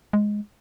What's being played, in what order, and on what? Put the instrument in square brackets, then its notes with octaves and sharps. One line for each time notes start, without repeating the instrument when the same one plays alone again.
[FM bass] G#3